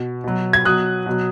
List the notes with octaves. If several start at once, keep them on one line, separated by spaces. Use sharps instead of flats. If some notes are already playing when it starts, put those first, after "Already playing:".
Already playing: B2
B2 F#3
G#6
B2 F#3 D#6 F#6
B2 F#3